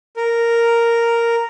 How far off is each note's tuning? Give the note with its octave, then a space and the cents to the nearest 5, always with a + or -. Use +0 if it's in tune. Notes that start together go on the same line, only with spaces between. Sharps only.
A#4 -5